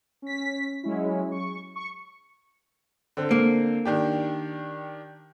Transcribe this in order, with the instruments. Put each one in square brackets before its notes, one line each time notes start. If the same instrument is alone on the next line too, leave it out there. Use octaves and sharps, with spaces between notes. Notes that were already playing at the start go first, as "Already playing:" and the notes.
[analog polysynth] C#4 B6
F#3 G#3 C#4 E4
C#6
C#6
[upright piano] D3 C4
[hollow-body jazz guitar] A#3
[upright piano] D#3 D4 G4